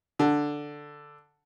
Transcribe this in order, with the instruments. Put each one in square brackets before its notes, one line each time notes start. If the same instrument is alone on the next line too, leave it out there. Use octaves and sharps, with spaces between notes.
[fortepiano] D3